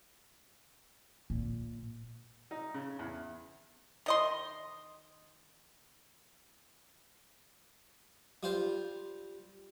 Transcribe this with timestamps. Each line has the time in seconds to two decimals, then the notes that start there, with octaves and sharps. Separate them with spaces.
1.30 A#2
2.51 D#4
2.74 C#3
2.99 E2
4.06 D#3 D#5 C6
8.43 G3 F4 C5